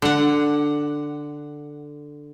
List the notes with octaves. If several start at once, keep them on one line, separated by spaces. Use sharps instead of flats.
D3 F#5